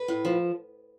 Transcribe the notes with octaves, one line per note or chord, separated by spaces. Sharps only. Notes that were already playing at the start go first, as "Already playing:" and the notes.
Already playing: B4
A2
F3